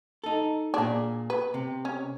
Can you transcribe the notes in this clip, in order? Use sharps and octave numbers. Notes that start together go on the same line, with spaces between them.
D#4 A4
A#2 D4 G#4
B4
C3
C#4